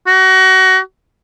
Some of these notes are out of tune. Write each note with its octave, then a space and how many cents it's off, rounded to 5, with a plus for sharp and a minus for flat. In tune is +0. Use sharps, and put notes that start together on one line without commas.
F#4 +30